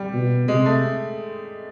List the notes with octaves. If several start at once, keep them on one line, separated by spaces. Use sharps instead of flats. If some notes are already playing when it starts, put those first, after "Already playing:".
Already playing: G3
B2
C3 G#3
A3